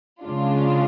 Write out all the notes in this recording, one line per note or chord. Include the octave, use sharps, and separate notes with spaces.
C#3 G#3 D4 F4